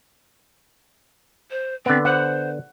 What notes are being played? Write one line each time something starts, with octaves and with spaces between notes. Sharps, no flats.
C5
D3 B3 C4
C5 F#5